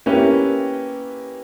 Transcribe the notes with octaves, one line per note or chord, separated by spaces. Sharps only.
A#3 B3 C#4 E4 G4 B4